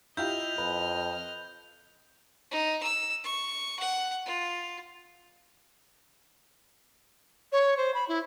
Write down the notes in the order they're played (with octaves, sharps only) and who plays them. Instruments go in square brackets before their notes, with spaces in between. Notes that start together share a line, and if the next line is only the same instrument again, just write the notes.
[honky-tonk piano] E4 F4 G4 [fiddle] D#5 F6 [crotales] G6
[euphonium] F2 [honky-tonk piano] B4
[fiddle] D#4
E6
C#6
F#5
F4
[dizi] C#5
C5
B5
E4